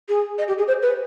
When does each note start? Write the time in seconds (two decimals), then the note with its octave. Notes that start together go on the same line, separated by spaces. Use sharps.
0.08 G#4
0.38 D#5
0.48 G4
0.58 G#4
0.67 C5
0.82 B4